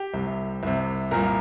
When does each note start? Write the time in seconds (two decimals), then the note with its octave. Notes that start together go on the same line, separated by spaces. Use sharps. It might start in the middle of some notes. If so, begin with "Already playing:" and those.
Already playing: G4
0.14 C2 C3
0.63 C2 C3
1.11 C2 A#2 A#4